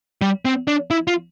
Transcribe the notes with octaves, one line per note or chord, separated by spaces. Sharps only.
G3
C4
D4
E4
F4